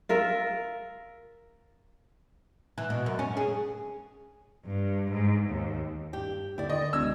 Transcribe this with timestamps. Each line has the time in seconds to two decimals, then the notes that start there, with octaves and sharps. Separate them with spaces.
0.09 F4 A#4 E5
2.78 E3
2.90 B2
3.06 F#2
3.19 C#4
3.37 G#4
4.65 G2
5.10 G#2
5.49 D#2
6.13 G2 G4
6.58 D#2 D3 E4 D5 G5
6.69 D3 D#3 D5 D#5
6.93 E1 D2 E6 G#6